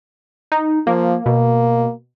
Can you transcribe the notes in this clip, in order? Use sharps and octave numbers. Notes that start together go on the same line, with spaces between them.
D#4
F3 A#3
B2 A#3